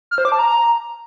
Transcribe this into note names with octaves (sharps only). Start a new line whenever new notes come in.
F6
C5
D6
A5
A#5